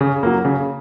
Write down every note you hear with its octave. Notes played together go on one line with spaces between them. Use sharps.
C#3
F#3 A#3
C#3